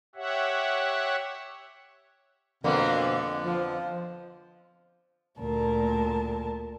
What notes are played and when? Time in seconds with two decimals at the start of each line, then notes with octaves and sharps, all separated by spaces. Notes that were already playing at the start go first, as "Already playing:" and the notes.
0.15 G4 C#5 E5 F#5
2.64 F2 B2 D3 A#3 B3
3.44 F3
5.39 D2 A#2 A#4 A5